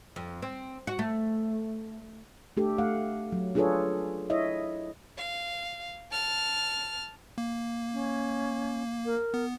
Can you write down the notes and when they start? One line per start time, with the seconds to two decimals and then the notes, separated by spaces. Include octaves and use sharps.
0.16 F2
0.42 C4
0.87 F#4
0.99 A3
2.57 A3 D4 G4 A4
2.78 A3 F5 F#5
3.32 F#3
3.55 D4 F4 G#4 A4 B4 C#5
4.30 E4 C#5 D#5 E5
5.18 F5
6.12 A5 F6
7.38 A#3
7.93 C#4
9.06 A#4
9.34 B3